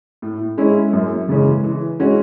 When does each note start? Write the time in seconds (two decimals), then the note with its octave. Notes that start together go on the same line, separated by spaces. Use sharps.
0.22 A2
0.58 G#3 C#4 E4
0.93 F#2
1.29 C#3 E3 G#3 C#4
1.64 E3
1.99 G#3 C#4 F#4